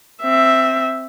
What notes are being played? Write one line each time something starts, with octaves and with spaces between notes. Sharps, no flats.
C4 E5